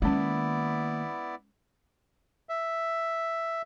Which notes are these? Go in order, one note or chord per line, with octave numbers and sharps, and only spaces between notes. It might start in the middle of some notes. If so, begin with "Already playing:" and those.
D#3 G#3 A#3 B3 C#4 E4 D5
E5